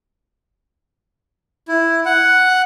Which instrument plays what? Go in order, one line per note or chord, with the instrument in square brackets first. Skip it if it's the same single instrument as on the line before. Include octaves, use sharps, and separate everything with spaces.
[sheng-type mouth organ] E4
F#5